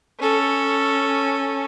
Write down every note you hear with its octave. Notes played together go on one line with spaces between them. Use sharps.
C#4 A4